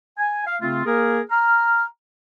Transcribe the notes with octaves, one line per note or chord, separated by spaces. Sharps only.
G#5
F5
C#3 A3 C4 F4
A#3 G#4 A#4
A#5 F6